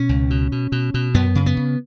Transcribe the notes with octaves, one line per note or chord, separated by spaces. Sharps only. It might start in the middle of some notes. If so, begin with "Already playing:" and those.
Already playing: B2 C#4
C#2
B2
B2
B2
B2
F#2 B3
C#3
B3
C#3